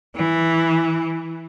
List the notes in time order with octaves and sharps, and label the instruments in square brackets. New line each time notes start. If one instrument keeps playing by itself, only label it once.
[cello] E3